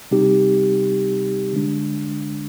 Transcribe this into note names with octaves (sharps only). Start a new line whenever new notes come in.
C3 G3 C4 D#4 G4
D3 G#3 D4